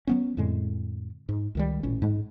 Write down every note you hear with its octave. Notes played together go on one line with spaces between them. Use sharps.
F#3 B3 C#4
F2 A2 D3 G#3
G#2
C#2 D#3 G3
A1 A#2 C#4
G#2 G#3